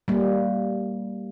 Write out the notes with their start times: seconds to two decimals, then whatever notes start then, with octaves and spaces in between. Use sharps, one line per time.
0.08 G3 A#3